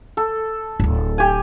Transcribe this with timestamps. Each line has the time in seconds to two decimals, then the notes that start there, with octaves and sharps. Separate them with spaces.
0.17 A4
0.80 D1 G#1
1.18 G4 G#5